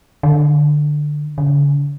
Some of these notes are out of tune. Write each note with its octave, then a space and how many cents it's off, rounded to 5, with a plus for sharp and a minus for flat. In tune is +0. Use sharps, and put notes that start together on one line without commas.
D3 +15
D3 -45